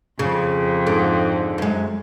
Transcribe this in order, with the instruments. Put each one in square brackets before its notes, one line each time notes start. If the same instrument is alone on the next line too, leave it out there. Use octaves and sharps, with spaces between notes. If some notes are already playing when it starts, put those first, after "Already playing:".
[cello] F2 [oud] C#3
[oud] G#2 D3
F#2 G#3